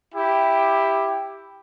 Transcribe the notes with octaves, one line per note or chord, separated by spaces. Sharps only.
E4 G4